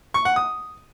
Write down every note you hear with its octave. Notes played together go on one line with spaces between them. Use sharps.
C#6
F#5
D#6